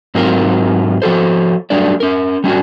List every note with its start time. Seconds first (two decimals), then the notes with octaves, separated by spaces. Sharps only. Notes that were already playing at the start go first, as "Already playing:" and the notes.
0.15 G#2 F#3 C4 F4 A#4
1.02 F3 F#4 A4 C5
1.70 F#3 G3 A3 D4 D5
2.00 C#4 A#4
2.44 G3 C#4 D4 F#4